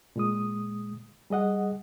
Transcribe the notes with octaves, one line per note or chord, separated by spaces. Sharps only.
A#2 G#3 D#6
G3 G#4 D#5 F#5